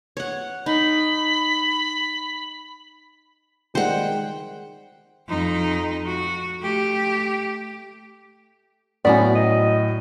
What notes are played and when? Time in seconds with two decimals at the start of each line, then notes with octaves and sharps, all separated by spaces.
0.17 C#5 F#5
0.66 D#4 B5
3.75 D#3 G3 G#3 C5 F#5 G5
5.28 F2 D#4
6.06 F#4
6.60 A3 G4
9.05 A2 F#3 B3 C#4 F#4 D5
9.35 D#5